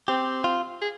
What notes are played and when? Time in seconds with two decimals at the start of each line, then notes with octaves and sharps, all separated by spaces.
0.08 C4 G4
0.44 F4
0.81 G#4